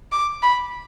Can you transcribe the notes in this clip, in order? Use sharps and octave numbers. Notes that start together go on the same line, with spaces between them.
D6
B5